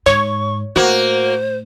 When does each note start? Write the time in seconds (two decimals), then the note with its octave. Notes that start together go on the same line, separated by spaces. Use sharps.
0.06 G#2 C#5 C#6
0.76 A2 A#3 F#4 C5